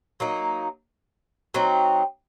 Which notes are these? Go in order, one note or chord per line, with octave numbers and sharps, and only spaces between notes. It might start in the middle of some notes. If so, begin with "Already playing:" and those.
F#3 A#3 D#4
F#3 C4 D#4